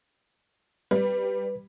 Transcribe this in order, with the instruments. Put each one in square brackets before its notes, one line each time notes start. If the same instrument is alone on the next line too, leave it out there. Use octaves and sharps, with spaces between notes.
[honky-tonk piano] G3 [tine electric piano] B4